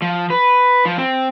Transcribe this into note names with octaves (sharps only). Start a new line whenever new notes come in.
F3
B4
F3
C4